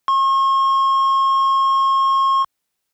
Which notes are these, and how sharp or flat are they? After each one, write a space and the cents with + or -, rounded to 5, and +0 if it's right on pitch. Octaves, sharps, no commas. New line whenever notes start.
C#6 -45